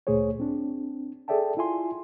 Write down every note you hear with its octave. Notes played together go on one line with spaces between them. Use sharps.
D2 A#2 A3 G#4 C5 C#5
C4 D4
G#4 A4 D5 E5 G5 A5
E4 F4 E5 G#5 C6